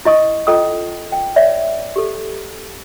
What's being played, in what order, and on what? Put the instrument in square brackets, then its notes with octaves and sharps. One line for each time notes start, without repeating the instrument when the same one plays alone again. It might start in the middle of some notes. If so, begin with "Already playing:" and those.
[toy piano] E4 D#5 C#6 D#6
C#4 F4 A4 D#5 G5 D#6
G5
C#5 D5 E5
G4 A4